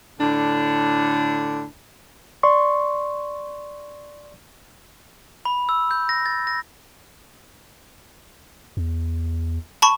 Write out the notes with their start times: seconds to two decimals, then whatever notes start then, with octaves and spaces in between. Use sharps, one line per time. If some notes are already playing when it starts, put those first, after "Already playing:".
0.20 A2 D3 D4
2.43 D5 C6 C#6
5.45 B5
5.69 E6
5.91 G6
6.09 A#6
6.26 A6
6.47 A#6
8.77 E2
9.82 A5 B5 C#6